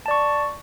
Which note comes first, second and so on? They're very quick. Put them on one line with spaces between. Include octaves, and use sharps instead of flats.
A5 D5 C#6